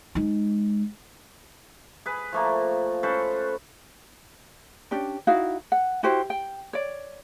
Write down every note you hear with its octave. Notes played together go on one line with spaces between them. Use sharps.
G#3 D#4
G#4 B4
F3 A3 A#3
C#4 A4 B4 C5
C#4 D4 G4 D5
D#4 E4 F#4 F5
F#5
E4 F#4 G4 C5
G5
C#5 D5